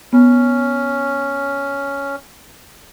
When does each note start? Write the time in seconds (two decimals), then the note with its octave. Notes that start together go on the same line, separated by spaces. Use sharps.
0.13 B3 C#4